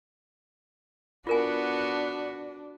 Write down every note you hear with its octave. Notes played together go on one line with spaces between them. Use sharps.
B3 D4 F4 F#4 A#4 G#5